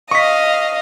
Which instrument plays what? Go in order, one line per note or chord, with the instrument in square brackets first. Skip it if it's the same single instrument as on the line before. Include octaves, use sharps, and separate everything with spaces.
[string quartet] D#5 F5 [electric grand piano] C#6 B6